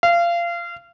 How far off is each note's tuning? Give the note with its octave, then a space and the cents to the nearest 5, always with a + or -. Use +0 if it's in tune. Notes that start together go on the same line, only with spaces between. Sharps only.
F5 -25